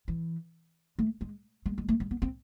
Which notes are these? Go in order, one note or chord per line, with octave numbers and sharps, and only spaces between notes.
E3
A3
G#3
G#3
G#3
A3
G#3
B3
C4